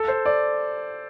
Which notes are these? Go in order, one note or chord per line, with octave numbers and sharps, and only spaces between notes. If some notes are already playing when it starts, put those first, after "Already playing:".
Already playing: A4
C5
D5